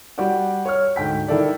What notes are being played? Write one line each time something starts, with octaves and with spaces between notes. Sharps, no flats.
G3 F#4 G4 D5 F#5
C#5 C#6 F6
D2 G#2 G5 B6
D#3 E4 A4 D5